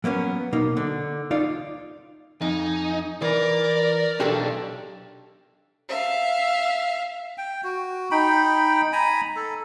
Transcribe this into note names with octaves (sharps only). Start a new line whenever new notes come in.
F#3 A#3 B3 C#4
B2 A#3 D#4
D3
D#4 F4 D5 F5
F2 D#4 G#5
E3 A#4 D5
B1 D4 G4 A4
E5 F5
G5
F#4
D#4 G5 B5
G#5 A#5 B5
A4